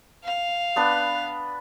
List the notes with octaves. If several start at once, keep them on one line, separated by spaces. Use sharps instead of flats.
F5
B3 D4 B4